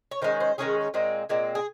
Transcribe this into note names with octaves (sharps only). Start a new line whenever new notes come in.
C#5
D#3 G#3 C#4 C5
C5
D#3 G#3 C#4 G#4
A#2 G#3 C4
A#2 G#3 C4
G#4